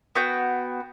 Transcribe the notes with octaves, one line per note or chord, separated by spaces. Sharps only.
B3 F#4 G5